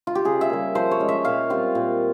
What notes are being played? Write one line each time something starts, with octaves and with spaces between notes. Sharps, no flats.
F4
G4
C#3 G#4
E5
G3 A#3
F3 C5
C#5
G#3 C#4
E5
A#2 F5
G3 C4 F4
A#2